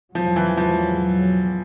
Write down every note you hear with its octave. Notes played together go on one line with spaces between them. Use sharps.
E2 B2 F3 F#3
E3
F3